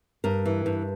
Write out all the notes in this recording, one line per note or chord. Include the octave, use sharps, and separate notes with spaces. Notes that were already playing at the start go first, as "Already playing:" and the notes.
G2 A#4
E3
G2